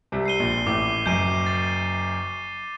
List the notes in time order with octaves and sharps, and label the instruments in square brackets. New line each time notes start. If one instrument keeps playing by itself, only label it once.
[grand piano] C2 C3
[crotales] C7 D#7 G7
[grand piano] A#1 A#2
[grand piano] A1 A2 [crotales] D6
[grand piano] F#1 F#2 [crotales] G6 C7 D#7
[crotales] A6